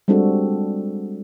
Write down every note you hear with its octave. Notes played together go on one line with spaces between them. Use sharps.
G3 G#3 C4 D4 F#4 A4